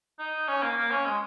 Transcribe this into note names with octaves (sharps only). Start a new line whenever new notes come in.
D#4
C#4
A#3
A#3
C#4
G#3